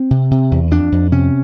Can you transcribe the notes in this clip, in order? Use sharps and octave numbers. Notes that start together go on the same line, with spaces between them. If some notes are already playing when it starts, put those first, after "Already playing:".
Already playing: C4
C3
C3
E2
F2 D4
F2
C3 C#4